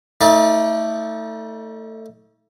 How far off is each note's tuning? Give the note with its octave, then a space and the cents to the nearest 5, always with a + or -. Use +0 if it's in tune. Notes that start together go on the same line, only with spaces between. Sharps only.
A3 +20 D#4 +45 D5 +0